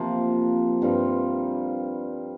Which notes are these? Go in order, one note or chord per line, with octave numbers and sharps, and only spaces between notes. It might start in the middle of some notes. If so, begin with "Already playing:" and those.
Already playing: C3 F3 A#3
G2 G3 C4 F4